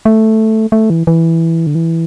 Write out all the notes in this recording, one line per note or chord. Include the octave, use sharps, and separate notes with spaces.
A3
A3
E3
E3
D3
E3